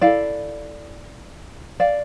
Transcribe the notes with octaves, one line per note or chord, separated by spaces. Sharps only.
E4 A4 D5 F5
D5 F5